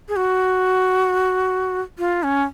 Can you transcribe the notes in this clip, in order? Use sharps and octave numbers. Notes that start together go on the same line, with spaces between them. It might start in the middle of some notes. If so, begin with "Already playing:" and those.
G#4
F#4
F4
C#4